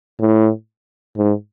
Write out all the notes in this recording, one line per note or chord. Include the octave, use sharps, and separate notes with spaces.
A2
G#2